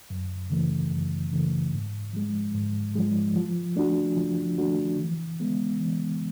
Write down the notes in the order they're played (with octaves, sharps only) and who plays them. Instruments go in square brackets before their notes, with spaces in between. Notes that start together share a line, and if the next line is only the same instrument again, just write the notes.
[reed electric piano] F#2
C#3 E3 A3
F#2
C#3 E3 A3
G#2
F3 G#3
G#2
F3 G#3
F3
A3 D4 F#4
F3
A3 D4 F#4
E3
G#3 B3
E3